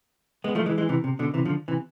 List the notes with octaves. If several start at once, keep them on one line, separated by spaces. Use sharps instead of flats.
G#3 B3
F3 A3
E3 G#3
E3 G#3
C3 E3
C3
B2 D3
C3 E3
D3 F3
C3 E3